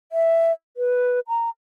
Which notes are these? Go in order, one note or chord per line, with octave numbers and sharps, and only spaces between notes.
E5
B4
A#5